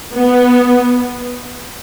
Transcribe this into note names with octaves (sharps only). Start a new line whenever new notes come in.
B3